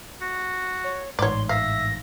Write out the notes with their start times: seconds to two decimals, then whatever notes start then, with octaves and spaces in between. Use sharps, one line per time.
0.21 F#4
0.84 C#5
1.19 A1 G#2 C#5 D5 C6
1.49 E5 F5 A#6